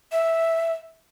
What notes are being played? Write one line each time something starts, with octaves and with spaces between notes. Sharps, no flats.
E5